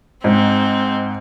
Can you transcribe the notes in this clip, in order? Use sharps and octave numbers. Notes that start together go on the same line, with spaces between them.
G#2 C4